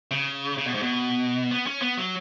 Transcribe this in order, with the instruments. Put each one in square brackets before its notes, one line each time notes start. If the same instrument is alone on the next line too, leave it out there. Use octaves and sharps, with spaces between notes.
[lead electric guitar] C#3
C#3
B2
G#2
B2
B3
C#4
B3
F#3